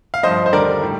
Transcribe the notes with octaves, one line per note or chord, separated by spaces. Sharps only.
F5
G2 F3 C5 D#5
C5
D#2 D3 G3 A#4 D5
A2 G3